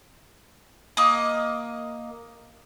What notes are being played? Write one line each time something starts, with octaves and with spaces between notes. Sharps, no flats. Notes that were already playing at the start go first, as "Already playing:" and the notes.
A#3 D#5